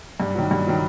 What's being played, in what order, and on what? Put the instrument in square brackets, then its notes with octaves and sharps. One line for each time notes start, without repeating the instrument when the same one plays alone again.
[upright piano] G2
D#3 F#3
G2
D#3 F#3